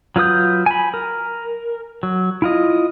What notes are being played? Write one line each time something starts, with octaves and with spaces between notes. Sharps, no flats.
F#3 F4 B4 D#6 G6
G#5 B5
A#4
F#3
E4 F4 D#5